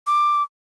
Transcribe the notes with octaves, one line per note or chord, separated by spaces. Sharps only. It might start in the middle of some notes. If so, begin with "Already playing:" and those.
D6